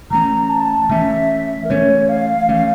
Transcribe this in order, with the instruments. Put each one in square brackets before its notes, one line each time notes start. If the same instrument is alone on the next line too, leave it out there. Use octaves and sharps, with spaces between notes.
[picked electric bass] E3 A3 C#4 [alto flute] A#5
[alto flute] A5
[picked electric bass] E3 A3 C#4 [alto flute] E5
[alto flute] A#4
[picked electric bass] E3 A3 C#4 [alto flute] C#5
[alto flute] F5
[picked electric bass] E3 A3 C#4